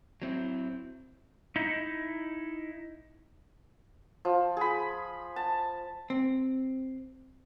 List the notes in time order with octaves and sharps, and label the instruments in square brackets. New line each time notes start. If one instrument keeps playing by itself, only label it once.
[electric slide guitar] F#3 C4 E4
D#4 E4
[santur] F3
G#4 B5
A5
[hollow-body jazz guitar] C4